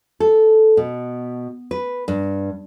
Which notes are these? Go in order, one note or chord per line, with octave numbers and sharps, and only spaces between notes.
A4
B2
B4
G2